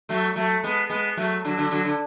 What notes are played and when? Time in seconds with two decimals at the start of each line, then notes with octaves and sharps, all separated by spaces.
0.09 F#3 A3
0.36 F#3 A3
0.64 G#3 B3
0.90 G#3 B3
1.17 F#3 A3
1.45 D3 F#3
1.57 D3 F#3
1.71 D3 F#3
1.85 D3